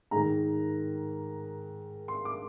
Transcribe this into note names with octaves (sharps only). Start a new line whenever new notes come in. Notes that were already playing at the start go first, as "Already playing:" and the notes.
G#2 D#3 A#5
C6
D6